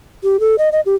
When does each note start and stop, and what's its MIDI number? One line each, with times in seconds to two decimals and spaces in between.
0.23 0.40 67
0.40 0.56 69
0.58 0.69 75
0.72 0.80 75
0.86 0.95 67